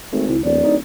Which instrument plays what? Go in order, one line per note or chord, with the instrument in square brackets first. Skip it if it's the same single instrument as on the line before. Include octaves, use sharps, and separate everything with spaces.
[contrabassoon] G#1 [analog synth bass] A3
[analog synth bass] C#2 [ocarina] E4
[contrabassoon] D1 [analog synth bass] E2 [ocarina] D5
[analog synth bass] D#4